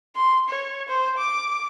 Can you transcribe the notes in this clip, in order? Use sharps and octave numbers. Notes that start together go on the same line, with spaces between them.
C6
C#5
C5
D6